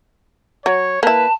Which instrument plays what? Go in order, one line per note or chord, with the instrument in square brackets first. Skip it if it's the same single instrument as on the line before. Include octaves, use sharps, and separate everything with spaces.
[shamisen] F#3 [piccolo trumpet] C#5
[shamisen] A#3 E4 [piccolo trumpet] B4 [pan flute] A5